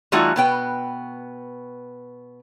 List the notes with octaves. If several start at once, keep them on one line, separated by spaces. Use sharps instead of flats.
E3 G3 A3 D#4 F4 F#4
B2 B3 G5